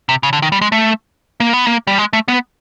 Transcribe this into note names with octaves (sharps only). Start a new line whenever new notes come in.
C3
C#3
D3
D#3
G3
G#3
A3
A#3
B3
A#3
G3
G#3
A3
B3